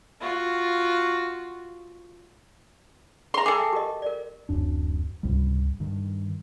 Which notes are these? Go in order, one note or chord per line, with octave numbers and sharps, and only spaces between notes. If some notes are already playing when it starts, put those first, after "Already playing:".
F4 F#4
G#4 E5 A#5 C6
G#4 A4 G5 D6
E5
G4 A#4 D#5
A#4 D5
D1 F#2 D4
C#2 G#2 C3 G3
G2 D#3